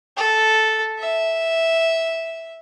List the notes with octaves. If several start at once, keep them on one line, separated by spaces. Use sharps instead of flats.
A4
E5